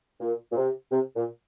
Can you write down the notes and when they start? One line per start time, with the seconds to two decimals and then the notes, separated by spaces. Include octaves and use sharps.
0.20 A#2
0.51 A#2
0.56 C3
0.92 C3
1.16 A#2